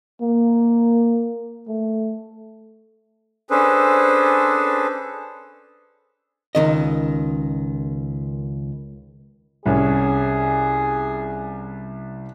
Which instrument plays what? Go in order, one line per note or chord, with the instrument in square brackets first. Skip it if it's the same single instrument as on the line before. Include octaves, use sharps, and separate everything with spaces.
[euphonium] A#3
A3
[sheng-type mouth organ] C#4 D4 G#4 A4 B4 C5
[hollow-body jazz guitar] C#2 D#3 D#5
[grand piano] C2 C#4 [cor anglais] G#4